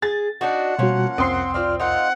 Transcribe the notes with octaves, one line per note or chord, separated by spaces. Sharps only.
G#4 A6
D4 D#4 F#4 F#5
B2 F3 G3 A#3 C#4 F#4
C2 F2 C4 C6 D#6 C7
F4 C5 D5 F6
D#4 F4 A#4 F#5